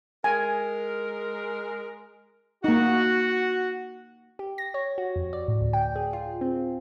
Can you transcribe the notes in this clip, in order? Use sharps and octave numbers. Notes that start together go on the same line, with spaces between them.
G#3 A#4 G#5
A#3 D#4 F#4
G4
A#6
C#5
F#4
F2
D5
A2
D2
G5
G#4
F4
C4